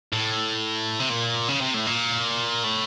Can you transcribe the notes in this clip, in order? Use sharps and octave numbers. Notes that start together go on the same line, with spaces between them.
A2
C3
A#2
C#3
C3
A2
A#2
A2